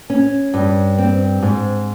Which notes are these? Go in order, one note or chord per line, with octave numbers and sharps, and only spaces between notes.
C#4
G2
C4
G#2